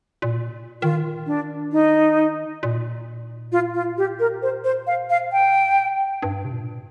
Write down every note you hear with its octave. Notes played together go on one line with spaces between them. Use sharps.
A#2
D#3 F4
D4
D#4
A#2
F4
F4
G4
A#4
C5
C5
F5
F5
G5
G2
C3
A#2